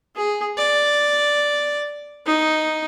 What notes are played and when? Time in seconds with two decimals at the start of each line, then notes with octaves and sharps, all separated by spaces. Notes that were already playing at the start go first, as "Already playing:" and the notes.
0.17 G#4
0.57 D5
2.26 D#4